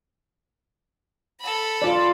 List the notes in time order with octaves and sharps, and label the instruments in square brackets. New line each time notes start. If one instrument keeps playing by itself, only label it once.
[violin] A4 B5
[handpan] F4 D5